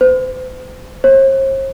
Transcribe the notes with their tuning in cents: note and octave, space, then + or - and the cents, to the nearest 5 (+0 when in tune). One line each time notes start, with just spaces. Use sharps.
C5 -40
C5 +45